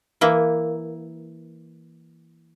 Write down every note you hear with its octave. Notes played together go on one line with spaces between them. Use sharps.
E3 A#3 E4